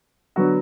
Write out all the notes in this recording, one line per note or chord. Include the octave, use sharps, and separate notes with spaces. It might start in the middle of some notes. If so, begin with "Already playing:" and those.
D3 F#3 B3 F#4